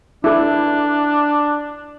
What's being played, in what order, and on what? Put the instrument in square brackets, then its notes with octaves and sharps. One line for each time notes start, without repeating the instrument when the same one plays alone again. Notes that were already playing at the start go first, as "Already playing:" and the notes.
[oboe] D4 [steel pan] E4 A4